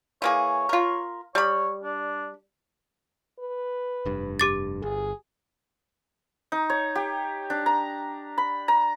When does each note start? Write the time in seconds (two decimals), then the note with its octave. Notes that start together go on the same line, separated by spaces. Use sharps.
0.22 E3 A#3 G#4 C#5
0.69 F4 A#4
1.35 G3 C#5 B5
1.83 D4
3.40 B4
4.05 F1 G2
4.40 G4 D6 A6
4.82 G1 G#4
6.52 D#4
6.70 C#5
6.95 G4
7.50 D4
7.66 A#5
8.38 B5
8.68 A#5